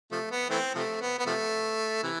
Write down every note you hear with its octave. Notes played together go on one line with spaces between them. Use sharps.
C3 F3 A3
B3
E3 A3 C4
C3 F3 A3
B3
B3
C3 F3 A3
C3 E3